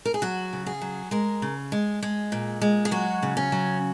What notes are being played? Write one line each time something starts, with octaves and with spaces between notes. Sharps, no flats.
A#4
G#4
F#3 F#4
C#3
G#4
F#3
G#3 A#4
C#3
G#3
G#3
A#2
G#3
G#4
F#3 F#4
C#3
C#4
F#3